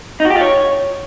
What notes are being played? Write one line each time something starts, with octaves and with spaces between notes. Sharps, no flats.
D#4
F#4
G4
F4
C#5